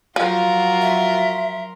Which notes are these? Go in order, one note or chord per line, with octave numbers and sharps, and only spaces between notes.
F3 F#3 F4 F#4 A#4 C6
E5